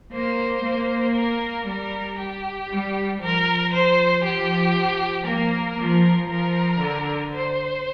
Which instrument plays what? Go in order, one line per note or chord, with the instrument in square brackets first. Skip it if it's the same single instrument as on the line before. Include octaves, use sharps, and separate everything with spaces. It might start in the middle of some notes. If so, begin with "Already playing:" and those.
[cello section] A#3 [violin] C5
[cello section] A#3
[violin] A#4
[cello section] G3 [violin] A#4
[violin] G4
[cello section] G3
[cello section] F3 [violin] A#4
[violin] C5
[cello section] F3 [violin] G4
[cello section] A#3 [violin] A#4
[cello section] F3
[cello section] F3 [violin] A#4
[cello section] D3
[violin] C5